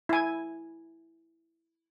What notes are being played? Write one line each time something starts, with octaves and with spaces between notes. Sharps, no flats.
E4 G#5